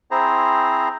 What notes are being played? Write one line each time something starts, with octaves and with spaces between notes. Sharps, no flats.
C4 E4 G#4 C5 A#5